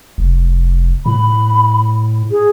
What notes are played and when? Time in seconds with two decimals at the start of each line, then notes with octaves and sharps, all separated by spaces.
0.18 F1
1.06 A2 B5
2.31 G#4